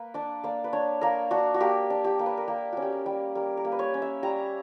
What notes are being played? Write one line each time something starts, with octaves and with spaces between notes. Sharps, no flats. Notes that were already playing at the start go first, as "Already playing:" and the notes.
Already playing: A#3 B4
D4 D5
A#3 D5
B4
D4 C#5
A#3 A#4
D4 F#4
F#4
A#3 G4
D4
G4
A#3
B4
A#4
A#3 G4
C#4 F#4
G4
A#4
G3
G3 A#4
A#4
A#3
B4
C#5
C#4
E5
G3 A#5